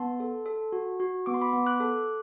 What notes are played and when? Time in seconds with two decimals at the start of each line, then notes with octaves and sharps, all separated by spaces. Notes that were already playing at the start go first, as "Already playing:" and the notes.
Already playing: B3 A5 C6
0.20 A4
0.46 A4
0.72 F#4
1.00 F#4
1.26 B3 D6
1.34 C6
1.41 B5 D6
1.53 B3
1.67 D6 F#6
1.80 A4